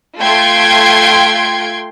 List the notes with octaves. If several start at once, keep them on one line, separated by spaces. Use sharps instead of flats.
A3 F4 G5 C6 G#6 D7